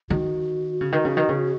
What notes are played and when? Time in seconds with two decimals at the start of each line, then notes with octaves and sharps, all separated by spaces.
0.10 D#3 F#4
0.81 C#3
0.92 D#3
1.05 C#3
1.17 D#3
1.29 C#3